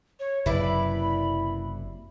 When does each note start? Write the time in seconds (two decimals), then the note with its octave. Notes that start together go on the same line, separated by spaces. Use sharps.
0.20 C#5
0.46 F#1 F#2 C3 E4 B4 D5 B5